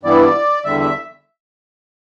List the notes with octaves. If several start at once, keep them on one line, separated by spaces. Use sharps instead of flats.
G2 E3 G3 B3 E4 D5
E2 D3 G3 E5
E5